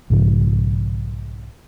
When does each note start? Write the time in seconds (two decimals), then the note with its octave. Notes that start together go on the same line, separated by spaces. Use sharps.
0.10 B1 G#2 C#3 F3